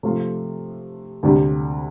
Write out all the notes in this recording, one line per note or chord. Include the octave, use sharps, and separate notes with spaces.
C3 F3 A3 F4
D2 C3 G3